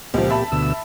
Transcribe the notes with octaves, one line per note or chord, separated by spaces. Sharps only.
C#2 A#2 F3 G4
E5 A5 B5
D2 B2 E6